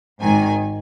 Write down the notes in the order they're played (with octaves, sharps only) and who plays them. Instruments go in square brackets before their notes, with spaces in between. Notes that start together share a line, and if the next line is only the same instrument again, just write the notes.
[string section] G#1 G#2 D#3 G#5